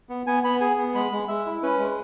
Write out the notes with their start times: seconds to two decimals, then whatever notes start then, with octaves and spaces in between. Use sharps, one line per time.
0.09 B3
0.26 B3 G#5
0.44 B3 B5
0.61 G#4 G#5
0.77 B3
0.95 G#3 B5
1.12 G#3
1.28 G#3 E5
1.46 E4
1.63 C#4 B4
1.79 G#3